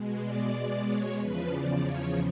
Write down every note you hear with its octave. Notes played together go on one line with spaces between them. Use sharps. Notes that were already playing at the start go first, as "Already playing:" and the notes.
Already playing: B2 G#3
D5
C#5
E2 C#3 F3 B4
D5
C#5